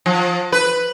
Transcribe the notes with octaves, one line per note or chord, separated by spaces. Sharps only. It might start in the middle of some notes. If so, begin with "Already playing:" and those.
F3
B4